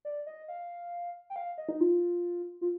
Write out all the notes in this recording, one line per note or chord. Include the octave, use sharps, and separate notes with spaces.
D5
D#5
F5
G5
F5
D#5
D#4
F4
F4